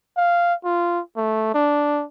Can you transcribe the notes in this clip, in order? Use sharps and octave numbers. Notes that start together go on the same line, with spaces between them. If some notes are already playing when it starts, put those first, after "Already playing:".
F5
F4
A3
D4